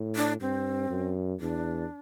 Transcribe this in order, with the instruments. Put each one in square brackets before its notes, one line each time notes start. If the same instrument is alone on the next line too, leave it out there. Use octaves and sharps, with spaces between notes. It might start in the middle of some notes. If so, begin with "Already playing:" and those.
Already playing: [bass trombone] A2
[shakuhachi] D4
[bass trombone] G2 [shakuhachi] C4
[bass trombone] F#2
[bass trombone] E2 [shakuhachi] D4